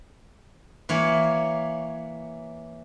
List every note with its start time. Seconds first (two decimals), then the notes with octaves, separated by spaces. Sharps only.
0.89 E3 A#3 C#5